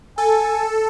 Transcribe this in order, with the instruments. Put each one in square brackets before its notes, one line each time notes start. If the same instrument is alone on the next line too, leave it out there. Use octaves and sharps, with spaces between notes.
[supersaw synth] A4 [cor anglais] G#5